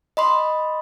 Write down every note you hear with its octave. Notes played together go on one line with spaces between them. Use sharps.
D#5 B5 C6